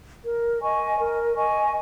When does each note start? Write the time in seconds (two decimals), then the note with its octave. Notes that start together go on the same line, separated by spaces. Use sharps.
0.24 A#4
0.62 D#5 G#5 C#6
0.99 A#4
1.35 D#5 G#5 C#6